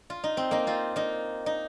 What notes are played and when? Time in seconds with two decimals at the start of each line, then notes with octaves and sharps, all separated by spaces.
0.10 F4
0.24 D#4
0.37 C4
0.51 A#3 D#4
0.67 C4 F4
0.96 A#3 D#4
1.46 D#4